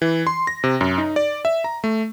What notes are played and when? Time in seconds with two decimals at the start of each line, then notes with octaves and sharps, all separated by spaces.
0.02 E3
0.27 C6
0.47 A#6
0.64 C3
0.81 F#2
0.98 D#4
1.16 D5
1.45 E5
1.64 A#5
1.84 A3